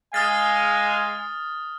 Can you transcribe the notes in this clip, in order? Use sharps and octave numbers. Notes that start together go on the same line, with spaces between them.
G#3 F5 G#5 D#6 F6 A6